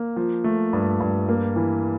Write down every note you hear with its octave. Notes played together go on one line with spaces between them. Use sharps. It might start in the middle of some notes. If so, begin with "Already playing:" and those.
Already playing: A#3
F3
A3
G2
G2
A#3
E3